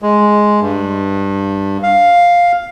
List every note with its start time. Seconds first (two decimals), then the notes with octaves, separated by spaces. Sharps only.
0.02 G#3
0.61 G2
1.83 F5